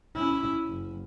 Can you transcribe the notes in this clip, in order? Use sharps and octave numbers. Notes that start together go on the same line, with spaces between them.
C#4 E4
F#1